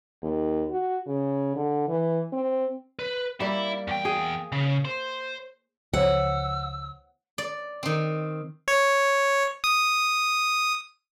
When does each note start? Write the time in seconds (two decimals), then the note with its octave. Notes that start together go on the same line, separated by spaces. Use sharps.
0.22 D#2
0.70 F#4
1.07 C#3
1.56 D3
1.88 E3
2.33 C4
2.99 B4
3.40 G3 A#3 E4
3.88 E2 G5
4.05 G#4
4.52 C#3
4.85 C5
5.93 C#2 F3 C5 C#5 F#5 E6
7.38 D5
7.83 D#3 C4
8.68 C#5
9.64 D#6